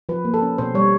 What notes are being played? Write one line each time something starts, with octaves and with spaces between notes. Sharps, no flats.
F3 B4
A#3
A4
C#4
B2 C5
G3 C#5